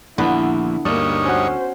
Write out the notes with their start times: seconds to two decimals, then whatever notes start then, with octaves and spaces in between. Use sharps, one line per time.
0.18 A#1 D#2 D3 B3 E4
0.85 D2 G2 A#3 D#4 C#5 D5
1.25 C#4 F#4 C5